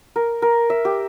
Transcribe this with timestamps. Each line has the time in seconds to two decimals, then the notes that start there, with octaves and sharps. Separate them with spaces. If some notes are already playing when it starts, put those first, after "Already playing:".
0.16 A#4
0.42 A#4
0.70 E5
0.85 G4